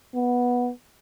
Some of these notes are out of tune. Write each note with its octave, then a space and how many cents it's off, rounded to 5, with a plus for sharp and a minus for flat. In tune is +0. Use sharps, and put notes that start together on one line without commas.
B3 -10